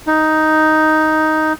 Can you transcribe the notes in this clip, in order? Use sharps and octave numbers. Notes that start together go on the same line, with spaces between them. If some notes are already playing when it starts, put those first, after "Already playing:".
D#4